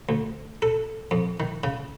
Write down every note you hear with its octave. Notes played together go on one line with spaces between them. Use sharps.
D2
A4
F2
D#3
C#3